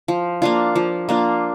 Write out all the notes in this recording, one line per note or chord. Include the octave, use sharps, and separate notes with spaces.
F3
A#3 D4 F4
F3
A#3 D4 F4